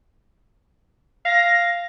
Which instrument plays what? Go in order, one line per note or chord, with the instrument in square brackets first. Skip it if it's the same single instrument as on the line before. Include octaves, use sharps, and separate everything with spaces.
[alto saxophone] F5 [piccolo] A#6